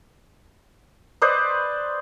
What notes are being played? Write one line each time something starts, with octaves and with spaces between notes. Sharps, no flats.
B4 C5 D5 D#5